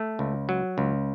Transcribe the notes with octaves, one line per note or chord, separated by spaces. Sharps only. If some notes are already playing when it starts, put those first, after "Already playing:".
Already playing: A3
C#2
F#3
C#2